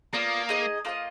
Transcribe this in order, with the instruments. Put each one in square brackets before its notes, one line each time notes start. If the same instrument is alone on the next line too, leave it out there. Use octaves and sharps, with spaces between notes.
[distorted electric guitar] A#3 [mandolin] B3 F4 A#4 D5
[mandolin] D#4 G#4 D#5
A#3 F4 A#4 D#5